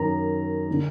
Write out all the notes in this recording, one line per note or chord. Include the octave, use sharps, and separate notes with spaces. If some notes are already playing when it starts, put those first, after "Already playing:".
Already playing: F#2 D#3 A#5
D3